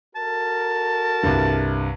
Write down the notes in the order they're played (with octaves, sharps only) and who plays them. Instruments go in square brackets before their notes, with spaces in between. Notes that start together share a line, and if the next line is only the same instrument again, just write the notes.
[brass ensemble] F#4 A4 A#4 [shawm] A5
[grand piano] C2 G2